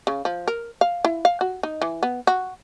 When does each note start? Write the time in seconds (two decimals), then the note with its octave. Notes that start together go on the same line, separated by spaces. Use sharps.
0.07 C#3
0.25 F3
0.48 A#4
0.81 F5
1.05 E4
1.25 F5
1.41 F#4
1.63 D#4
1.82 E3
2.03 B3
2.27 F#4